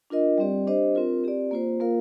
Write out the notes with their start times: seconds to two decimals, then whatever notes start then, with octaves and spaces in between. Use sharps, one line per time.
0.10 D4 F4 A#4 D#5
0.38 G3 C4 G4 D5
0.67 D4 G4 C5 D#5
0.95 C4 F4 A#4
1.24 C4 G4 D5
1.51 A#3 F4 C5
1.80 A#3 F4 A#4 F5